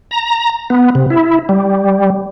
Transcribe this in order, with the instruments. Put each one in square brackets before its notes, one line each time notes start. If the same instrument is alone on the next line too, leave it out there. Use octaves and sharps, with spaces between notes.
[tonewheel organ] A#5
B3
C3
E4
G3